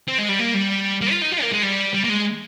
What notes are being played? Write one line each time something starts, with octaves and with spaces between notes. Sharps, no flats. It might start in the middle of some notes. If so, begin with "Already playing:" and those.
C4
G#3
G3
A#3
G3
A#3
F4
D#4
F4
A#3
G#3
G3
G3
A#3
G#3